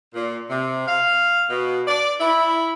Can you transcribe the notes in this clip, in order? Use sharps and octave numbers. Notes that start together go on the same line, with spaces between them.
A#2
C3
F5
B2
D5
E4